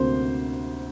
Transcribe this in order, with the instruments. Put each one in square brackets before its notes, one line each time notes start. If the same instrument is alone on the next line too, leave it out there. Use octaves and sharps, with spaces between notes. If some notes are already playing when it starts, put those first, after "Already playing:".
Already playing: [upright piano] D2 C3 A#3 C5